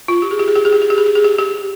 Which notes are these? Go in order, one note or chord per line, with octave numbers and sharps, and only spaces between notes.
F4
G4
G#4
G4
G#4
G4
G#4
G4
G#4
G4
G#4
G4
G#4
G4
G4